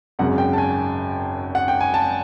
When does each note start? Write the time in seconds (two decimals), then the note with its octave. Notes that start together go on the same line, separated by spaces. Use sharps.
0.19 G#1 F#2 C#3 F#5
0.38 G5
0.53 A5
0.58 G#5
1.55 F#5
1.68 G5
1.81 G#5
1.94 A5